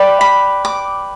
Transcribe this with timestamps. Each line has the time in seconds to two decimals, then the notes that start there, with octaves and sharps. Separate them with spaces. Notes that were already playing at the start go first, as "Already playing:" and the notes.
Already playing: G4 B4 D5
0.21 B5
0.65 D6